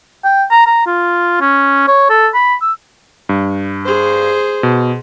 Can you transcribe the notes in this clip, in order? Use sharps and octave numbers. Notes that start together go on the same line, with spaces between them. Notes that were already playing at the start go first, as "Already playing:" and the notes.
G5
A#5
A#5
F4
C#4
C#5
A4
B5
E6
G2
G#4 C5
B2